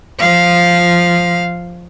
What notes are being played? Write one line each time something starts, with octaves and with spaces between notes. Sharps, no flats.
F3 F5